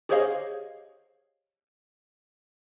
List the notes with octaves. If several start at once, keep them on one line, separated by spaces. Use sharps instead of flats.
G4 G#4 C5 C#5 D#5 F5